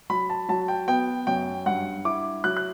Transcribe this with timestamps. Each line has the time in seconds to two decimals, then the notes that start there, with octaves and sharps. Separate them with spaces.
0.10 F#3 B5
0.30 A5
0.49 F#3 A5
0.68 G5
0.88 B3 G5
1.27 F#2 G5
1.66 G2 F#5
2.05 E4 D6
2.44 F#3 F#6
2.57 F#6